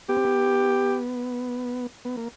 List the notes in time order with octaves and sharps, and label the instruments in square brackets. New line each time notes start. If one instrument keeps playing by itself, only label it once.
[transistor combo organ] B3 [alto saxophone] G4
[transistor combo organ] C4
B3
B3
A#3